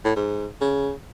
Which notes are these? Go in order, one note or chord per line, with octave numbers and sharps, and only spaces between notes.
A2
G#2
C#3